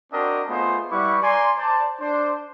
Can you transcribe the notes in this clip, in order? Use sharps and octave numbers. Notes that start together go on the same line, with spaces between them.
C4 D4 F#4 A#4 D#5 G5
A3 B3 F4 G#4 C5 D#5
G3 E4 B4 F#5 C#6 D6
D5 G#5 A#5 C6
C5 D5 A5
D4 C5